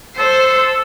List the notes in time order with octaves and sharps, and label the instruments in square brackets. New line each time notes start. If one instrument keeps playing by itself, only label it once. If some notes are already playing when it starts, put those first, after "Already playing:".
[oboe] A4 [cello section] C5